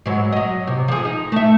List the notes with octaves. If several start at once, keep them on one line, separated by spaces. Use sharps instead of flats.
G#2 F#3
F#3 D#5
C3
F3 G#4
D#4
A3 E5